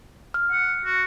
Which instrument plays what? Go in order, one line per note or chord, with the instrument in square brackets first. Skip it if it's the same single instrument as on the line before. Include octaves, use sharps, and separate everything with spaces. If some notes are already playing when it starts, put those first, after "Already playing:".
[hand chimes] F6
[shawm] F#5
F#4